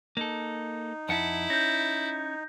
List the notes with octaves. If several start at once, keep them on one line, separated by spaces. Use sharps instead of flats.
A#3 D#4 A4
F2 E4 F#5 A5
C#4 G6 A#6